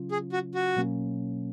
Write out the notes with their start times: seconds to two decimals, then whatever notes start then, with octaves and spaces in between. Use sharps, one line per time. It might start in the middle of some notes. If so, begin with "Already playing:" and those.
Already playing: C#3 F#3 C#4 F4
0.11 G#4
0.33 F#4
0.55 F#4
0.76 B2 F#3 A#3 C#4